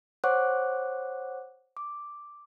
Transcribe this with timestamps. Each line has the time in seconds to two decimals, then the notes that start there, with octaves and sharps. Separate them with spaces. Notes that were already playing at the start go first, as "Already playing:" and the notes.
0.24 C5 C#5 F#5 C#6 D6 F#6
1.77 D6